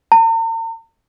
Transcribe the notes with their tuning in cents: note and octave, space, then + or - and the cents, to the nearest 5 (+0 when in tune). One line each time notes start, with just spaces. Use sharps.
A#5 -45